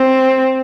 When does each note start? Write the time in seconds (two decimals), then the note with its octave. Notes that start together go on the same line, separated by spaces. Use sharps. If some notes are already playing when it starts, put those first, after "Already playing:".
Already playing: C4